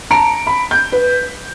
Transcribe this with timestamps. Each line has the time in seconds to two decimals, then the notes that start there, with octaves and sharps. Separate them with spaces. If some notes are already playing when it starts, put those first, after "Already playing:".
0.11 A5 A#5 C#7 D7
0.47 B5
0.71 G6
0.92 B4